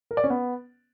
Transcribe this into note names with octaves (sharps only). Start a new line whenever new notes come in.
A#4
D5
C#4
B3